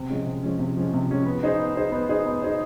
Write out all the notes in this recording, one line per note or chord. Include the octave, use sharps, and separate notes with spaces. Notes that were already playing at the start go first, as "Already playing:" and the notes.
Already playing: C3
F3 G#3 C#4
C3
F3 G#3 C#4
C3
F3 G#3 C#4
C3
F3 G#3 C#4
B3
D#4 G#4 C5
B3
D#4 G#4 C5
B3
D#4 G#4 C5
B3
D#4 G#4 C5